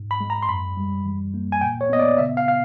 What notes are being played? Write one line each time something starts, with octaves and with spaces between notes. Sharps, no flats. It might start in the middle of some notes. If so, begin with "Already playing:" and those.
Already playing: G#2
B5
G#3
A#5
C6
F#2 B5
G3
E3
A#3
G#5
A#2 G5
C#5
B3 D#5
D5
C#3 E5
F5
F5